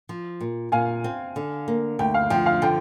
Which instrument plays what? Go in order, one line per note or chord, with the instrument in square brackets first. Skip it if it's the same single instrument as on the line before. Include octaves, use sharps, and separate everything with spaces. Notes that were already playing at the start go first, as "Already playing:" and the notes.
[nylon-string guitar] F3
A#2
[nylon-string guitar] A#2 [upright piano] F5 G#5
[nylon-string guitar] C4
D3
A#3
[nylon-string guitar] D2 [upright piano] G5
[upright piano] F5
[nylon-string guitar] F3 [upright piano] G5
[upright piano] F5
[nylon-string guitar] D3 [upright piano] G5